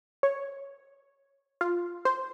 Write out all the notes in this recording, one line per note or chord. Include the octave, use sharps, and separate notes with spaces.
C#5
F4
C5